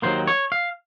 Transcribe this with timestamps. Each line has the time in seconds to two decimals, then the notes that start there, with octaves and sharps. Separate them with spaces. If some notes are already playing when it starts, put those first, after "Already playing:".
0.02 D#2 D#3 F#3 A#3 C5
0.27 C#5
0.52 F5